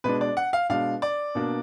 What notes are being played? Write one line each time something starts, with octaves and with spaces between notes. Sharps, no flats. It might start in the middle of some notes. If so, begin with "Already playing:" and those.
B2 G#3 D4 B4
D5
F#5
F5
B2 G#3 D4 F5
D5
B2 A#3 D4